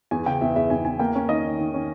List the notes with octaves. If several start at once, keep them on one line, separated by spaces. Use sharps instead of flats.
E2 G#5
C#3 G5
E2 E5
E2 E5
E2 G#5
E2 G#5
A#3 G5
C#4
D#3 D#5
D#3
D#3
C#4